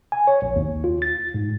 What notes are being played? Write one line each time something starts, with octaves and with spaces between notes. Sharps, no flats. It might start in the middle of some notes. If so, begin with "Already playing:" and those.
G#5
C#5
A#1
D#2
F4
A6
G#2